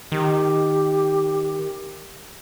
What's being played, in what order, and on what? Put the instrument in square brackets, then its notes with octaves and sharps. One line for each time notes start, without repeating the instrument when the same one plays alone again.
[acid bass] D#3 [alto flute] G4